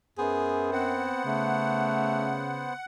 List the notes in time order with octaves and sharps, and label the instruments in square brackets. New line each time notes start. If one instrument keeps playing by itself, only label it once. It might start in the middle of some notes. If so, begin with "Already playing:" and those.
[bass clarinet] F#2 [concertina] B3 C5 [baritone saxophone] G#4
[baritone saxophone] C4 [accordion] F#5
[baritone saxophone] C#3 [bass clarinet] A3